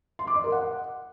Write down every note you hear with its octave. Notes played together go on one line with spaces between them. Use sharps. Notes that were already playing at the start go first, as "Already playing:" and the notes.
C6
D6
D#5
A#4
F#5